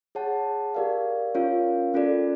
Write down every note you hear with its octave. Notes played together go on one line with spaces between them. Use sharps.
G#4 C#5 F#5 A5
G4 A#4 D5 F5
C#4 F4 A#4 C#5 F5
C#4 F4 A4 D5